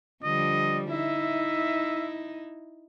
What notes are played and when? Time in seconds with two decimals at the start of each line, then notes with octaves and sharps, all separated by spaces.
0.24 D3 F3 G3 D#5
0.91 D#4 E4 E5